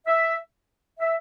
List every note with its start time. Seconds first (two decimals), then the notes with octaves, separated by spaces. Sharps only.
0.07 E5
1.00 E5